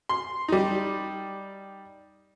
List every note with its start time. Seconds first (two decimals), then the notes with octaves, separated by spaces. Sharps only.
0.09 C6
0.48 G3 D#4